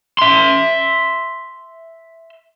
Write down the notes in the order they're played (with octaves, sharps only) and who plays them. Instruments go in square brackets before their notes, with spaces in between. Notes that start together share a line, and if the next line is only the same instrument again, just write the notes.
[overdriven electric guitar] E5 C6